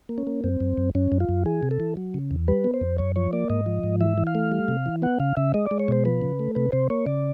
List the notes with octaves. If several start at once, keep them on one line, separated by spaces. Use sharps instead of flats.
A#3
C#4
A#3
F#2 C4
F#2
F#2
F#2 C#4
F#2
F4
F#2
E3 G#4
C3
A4
E3
F#3
C#3
E2
G3 B4
B3
C5
F2
F#2 C#5
F3 C#5
A#3 D5
G#2 D#5
F3
G#2
E3 E5
E3
F5
A3
G3
C3
E3
B3 F#5
C#3 F5
C#3 E5
G#3 D#5
G#3 D5
C#5
B2 C5
F3 B4
C#3
A3
C3 B4
C3 C5
A#3 C#5
C#3 D5